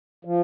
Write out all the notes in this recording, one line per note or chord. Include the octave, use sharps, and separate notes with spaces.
F3